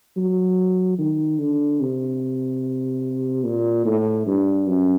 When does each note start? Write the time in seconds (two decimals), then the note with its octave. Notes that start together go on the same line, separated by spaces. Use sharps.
0.17 F#3
0.99 D#3
1.39 D3
1.81 C3
3.44 A#2
3.85 A2
4.26 G2
4.67 F#2